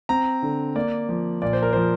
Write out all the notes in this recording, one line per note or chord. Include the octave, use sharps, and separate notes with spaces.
C4 A#5
D3
A#3 D5
F3
A#2 D5
C5
A#4
F3 C5